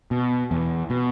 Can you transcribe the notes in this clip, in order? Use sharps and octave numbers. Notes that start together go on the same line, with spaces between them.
B2
E2
B2